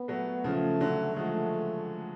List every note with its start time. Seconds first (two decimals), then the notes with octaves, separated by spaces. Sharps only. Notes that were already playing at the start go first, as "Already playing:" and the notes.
Already playing: B3
0.08 F#3 A3
0.44 C#3 F3 A3
0.80 D3 F#3
1.16 F3 G#3 A3